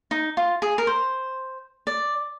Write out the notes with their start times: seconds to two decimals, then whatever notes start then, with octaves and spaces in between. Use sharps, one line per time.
0.11 D#4
0.37 F4
0.62 G#4
0.78 A#4
0.87 C5
1.87 D5